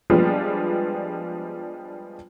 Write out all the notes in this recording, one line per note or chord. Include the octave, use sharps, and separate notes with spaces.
F3 G3 G#3 B3 D4 F4